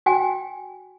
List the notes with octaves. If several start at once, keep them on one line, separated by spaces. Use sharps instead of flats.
F#4 G5 G#5